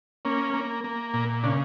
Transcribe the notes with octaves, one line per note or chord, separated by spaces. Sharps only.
A#3 C#4
A#3
A#3
A#2
C#3 D4